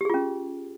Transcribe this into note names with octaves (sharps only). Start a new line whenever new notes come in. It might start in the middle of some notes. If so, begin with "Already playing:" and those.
C#4 F4 G4 G#4